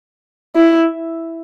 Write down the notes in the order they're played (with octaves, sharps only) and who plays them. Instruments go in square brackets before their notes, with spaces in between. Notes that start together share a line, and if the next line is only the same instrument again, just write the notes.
[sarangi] E4